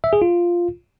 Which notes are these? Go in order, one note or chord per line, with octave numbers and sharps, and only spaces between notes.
E5
G#4
F4